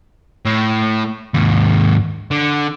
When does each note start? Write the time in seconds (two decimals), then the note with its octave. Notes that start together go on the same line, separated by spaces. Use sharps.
0.46 A2
1.34 D#2 G#2
2.31 D3